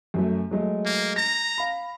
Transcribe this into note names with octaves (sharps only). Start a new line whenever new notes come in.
F#2 F#3 A3
F#3 G#3 A3
A#3
A#5 A#6
F5 B5